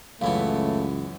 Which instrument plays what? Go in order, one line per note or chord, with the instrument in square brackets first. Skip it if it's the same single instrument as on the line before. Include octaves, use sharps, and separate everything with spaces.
[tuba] C#2 [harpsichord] F#2 E3 B3 [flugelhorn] A3 [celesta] F5